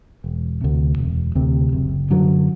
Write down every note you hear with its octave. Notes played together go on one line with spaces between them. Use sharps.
E1
D2 C3
E1
D2 C3
F#1
F#2 D3 F#3